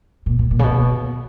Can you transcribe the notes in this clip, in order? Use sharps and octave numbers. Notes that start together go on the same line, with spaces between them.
A#2
A#2
A#2
C#3
B2